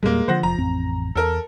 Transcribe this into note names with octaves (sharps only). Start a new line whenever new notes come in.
E2 A#2 G3 G#3 A#3
D3 F3 C5 F#5 A#6
F1 F3 A#5
A1 F2 C4
E2 A4 A#4